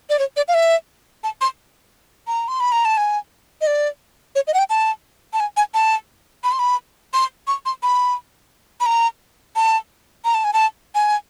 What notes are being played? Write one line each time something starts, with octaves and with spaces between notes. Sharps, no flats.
D5
C#5
D5
F5
E5
A5
C6
A#5
C6
B5
A#5
A5
G#5
D#5
D5
C#5
D#5
F#5
G5
A5
A5
G#5
G#5
A5
B5
C6
B5
C6
C#6
C6
B5
B5
A#5
A5
A#5
A5
G#5
A5
G#5